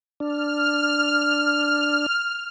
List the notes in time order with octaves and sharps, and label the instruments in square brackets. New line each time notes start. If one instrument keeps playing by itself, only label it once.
[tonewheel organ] D4 [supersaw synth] F6